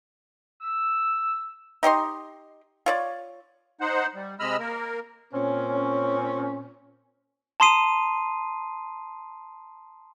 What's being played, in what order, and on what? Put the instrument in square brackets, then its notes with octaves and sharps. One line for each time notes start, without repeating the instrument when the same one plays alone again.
[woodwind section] E6
[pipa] D#4 G4 D#5 C6
F4 C#5 D5
[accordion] D#4 C5 F#5
G3
C3 G#3 D#5 B5 E6 F6
A#3 A#4
[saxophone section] A#2 C4 C#4
[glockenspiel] A5 A#5 C6 D#6 C7 D#7